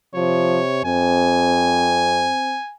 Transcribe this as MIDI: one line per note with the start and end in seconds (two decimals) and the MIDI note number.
0.15 0.82 48
0.15 0.60 53
0.15 0.83 73
0.84 2.31 41
0.84 2.58 60
0.84 2.75 80